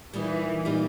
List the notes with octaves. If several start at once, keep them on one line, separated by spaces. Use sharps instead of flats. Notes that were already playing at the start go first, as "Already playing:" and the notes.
A#2 E3 G3 A#3 D#4
A#2 G3 A#3 D#4